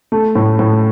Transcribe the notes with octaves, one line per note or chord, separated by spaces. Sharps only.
A3
A2
A2